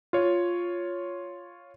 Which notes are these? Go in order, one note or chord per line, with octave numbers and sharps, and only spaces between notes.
F4 C#5